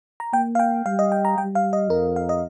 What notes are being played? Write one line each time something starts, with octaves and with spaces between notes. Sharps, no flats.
A#5
A#3 G5
F5
G5
G3 F5
D#5
G5
A#5
G3 G5
F5
D#5
F2 A#4
F5
D#5